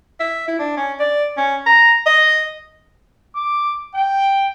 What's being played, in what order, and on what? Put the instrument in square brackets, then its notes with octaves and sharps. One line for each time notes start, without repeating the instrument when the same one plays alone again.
[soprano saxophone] E5
E4
D4
C#4
D5
C#4
A#5
D#5
[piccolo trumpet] D6
G5